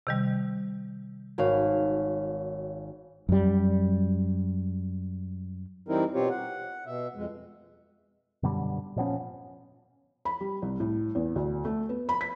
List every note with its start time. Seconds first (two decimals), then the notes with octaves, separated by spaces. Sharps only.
0.07 C3 D#3 G3
1.38 G#1 F#4 C#5 F5
3.29 F#2 G3
5.88 E3 G3 C4 D#4 E4 A#4
6.14 B2 C4 F4 G4 C#5
6.30 F#5
6.86 B2 E5
7.15 F2 G#3
8.43 F#2 B2 D3 G3
8.96 A#2 F3 B3 C#4
10.25 B5
10.40 G3
10.62 C2
10.80 A2
11.15 E2
11.36 D2
11.65 A3
11.89 B3
12.09 B5
12.21 B6